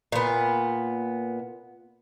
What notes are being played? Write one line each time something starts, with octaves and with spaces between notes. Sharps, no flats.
A#2 B3